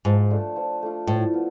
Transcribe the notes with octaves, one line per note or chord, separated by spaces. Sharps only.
G#2 F3
A3 D4 F4
F3
A3 D4 F4
A2 F3
B3 F4